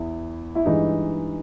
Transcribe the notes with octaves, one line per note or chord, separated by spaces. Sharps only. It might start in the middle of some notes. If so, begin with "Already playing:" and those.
Already playing: E2 E4
E4
G2 E3 G#3 D#4